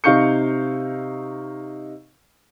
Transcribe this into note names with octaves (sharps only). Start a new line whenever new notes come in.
C3 D#4 F5 C#6 G6 C#7